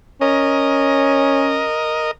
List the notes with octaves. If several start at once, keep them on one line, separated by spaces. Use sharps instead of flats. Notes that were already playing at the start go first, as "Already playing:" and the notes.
C#4 A#4 D#5